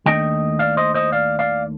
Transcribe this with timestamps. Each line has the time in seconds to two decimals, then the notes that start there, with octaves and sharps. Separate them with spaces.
0.06 D#2 D#3 A3 D4 D#5 G5
0.59 D5 F5
0.77 C5 D#5
0.94 C5 D#5
1.12 D5 F5
1.39 D5 F5